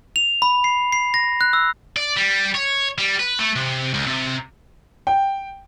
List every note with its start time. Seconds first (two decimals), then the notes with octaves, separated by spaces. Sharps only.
0.16 F7
0.42 B5
0.64 C7
0.92 C7
1.14 A#6
1.41 F#6
1.53 E6
1.97 D5
2.17 G3
2.55 C#5
2.98 G3
3.20 B4
3.39 A3
3.56 C3
3.94 C#2
4.07 C3
5.07 G5